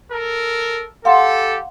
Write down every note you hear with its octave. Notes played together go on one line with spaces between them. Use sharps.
A4 A#4
G4 A4 F5 F#5 C6